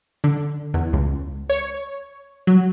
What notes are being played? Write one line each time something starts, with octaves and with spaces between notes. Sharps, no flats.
D3
E2
C#2
C#5
F#3